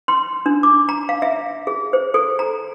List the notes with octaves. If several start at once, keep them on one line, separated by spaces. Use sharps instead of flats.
C6
D4
D6
A#5
F5
E5
G#4
C5
A4
A#5